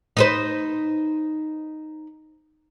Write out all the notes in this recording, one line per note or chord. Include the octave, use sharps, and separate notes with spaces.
D#4 B4 C5